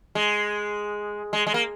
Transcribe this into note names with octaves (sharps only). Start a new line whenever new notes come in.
G#3
G#3
G#3
A#3